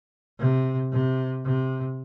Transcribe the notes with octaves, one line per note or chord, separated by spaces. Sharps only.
C3
C3
C3